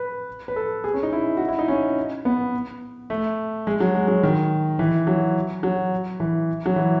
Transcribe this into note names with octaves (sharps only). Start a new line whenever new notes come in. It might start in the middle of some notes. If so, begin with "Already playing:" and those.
Already playing: B4
B4
A4
G#4
C#4
D#4
E4
F#4
E4
D#4
C#4
B3
A3
G#3
F#3
G#3
F#3
D#3
E3
F#3
F#3
E3
F#3
E3